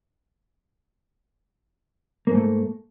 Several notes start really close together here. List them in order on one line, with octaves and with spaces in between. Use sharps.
A#3 G#2 A3